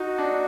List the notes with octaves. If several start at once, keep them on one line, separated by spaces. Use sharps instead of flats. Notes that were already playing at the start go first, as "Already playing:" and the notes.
Already playing: D#4 F#4
D4
D#4